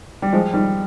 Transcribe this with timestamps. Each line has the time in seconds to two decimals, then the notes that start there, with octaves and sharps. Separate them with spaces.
0.22 G3
0.33 F3 G#3
0.53 D#3 G3